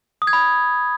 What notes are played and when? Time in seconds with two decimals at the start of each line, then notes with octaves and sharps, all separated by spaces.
0.22 D#6
0.27 G#6
0.33 B5